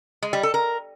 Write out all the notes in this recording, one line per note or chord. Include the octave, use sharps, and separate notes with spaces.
G#3
G3
A4
A#4